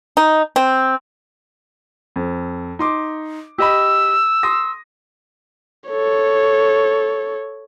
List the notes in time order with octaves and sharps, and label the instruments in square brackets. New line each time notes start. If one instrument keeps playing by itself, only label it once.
[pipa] D#4
C4
[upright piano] F2
D#4 C6 D6
[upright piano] G4 D#5 B5 [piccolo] E6
[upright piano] C6 D#6 A#6
[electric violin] A4 C#5